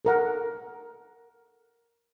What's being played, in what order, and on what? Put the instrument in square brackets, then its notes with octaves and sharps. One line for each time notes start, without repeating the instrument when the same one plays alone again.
[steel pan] A4 A#4 F#5